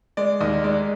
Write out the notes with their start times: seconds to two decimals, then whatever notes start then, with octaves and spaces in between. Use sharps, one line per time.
0.17 G#3 D5
0.41 D#2 D#5
0.64 G#3 D5